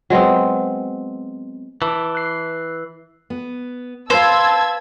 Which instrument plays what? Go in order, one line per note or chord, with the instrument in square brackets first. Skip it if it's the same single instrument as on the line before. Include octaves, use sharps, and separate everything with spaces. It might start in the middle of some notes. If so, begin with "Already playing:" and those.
[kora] F#3 G#3 B3 C4
[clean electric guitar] E3 [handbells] A5 D6
[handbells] F#6 C7
[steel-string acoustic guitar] B3
[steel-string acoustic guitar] B4 F5 [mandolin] C5 [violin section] A5 E6 G#6